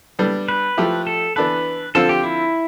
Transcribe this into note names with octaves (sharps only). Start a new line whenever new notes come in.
G3 B3 D4 A4
B4
F3 A3 E4 G4
A4
E3 B3 D4 A4 B4
D3 F3 C4 F4 A4
G4
E4